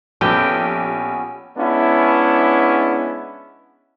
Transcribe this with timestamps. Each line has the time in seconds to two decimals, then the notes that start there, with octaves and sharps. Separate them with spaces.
0.21 A#1 B3 C#4 G4 A4
1.57 G#3 B3 C#4 D4 E4